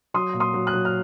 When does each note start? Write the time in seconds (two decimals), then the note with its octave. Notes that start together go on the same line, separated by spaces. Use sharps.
0.14 F#3 C6 D#6
0.33 A#2
0.40 C6 D#6
0.54 F#3
0.67 D#6 F#6
0.73 F#3
0.85 F6